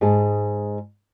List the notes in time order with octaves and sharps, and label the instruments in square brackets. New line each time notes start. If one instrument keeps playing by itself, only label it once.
[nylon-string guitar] G#2 G#4 A5